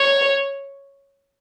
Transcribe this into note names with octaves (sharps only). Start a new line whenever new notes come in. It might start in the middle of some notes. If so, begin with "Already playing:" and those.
Already playing: C#5